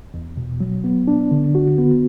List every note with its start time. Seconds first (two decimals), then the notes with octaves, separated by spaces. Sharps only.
0.14 E2
0.37 B2
0.60 F#3
0.84 B3
1.08 D4
1.31 D3
1.55 F#4
1.78 B3